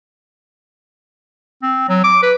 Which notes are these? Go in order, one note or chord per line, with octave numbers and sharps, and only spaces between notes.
C4
F#3
D6
B4